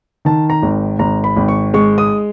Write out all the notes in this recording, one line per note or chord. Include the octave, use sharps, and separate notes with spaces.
D#3 A5
A#5
G#1
G#1 A#5
B5
G#1
C#6
G#3 C#6
D#6